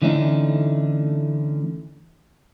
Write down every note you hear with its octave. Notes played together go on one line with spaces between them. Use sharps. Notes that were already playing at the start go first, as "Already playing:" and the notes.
D3 E3 A3 C#4 D#4